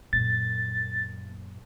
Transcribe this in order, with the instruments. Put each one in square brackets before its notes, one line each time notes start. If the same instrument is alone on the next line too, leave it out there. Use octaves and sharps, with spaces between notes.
[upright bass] F#2 A#2 [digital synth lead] A6